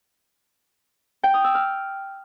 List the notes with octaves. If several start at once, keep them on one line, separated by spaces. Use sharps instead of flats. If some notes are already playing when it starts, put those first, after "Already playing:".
G5
D#6
E6
F6